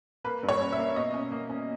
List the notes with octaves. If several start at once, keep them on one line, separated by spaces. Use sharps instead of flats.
A#3 B4
G2
C#5
C#4
E5
A#3
B2 D#5
C#4
A#3
C#4